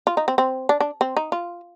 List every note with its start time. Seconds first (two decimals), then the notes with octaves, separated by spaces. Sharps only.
0.07 F4
0.17 D#4
0.28 C4
0.38 C4
0.69 D4
0.80 D4
1.01 C4
1.17 D#4
1.32 F4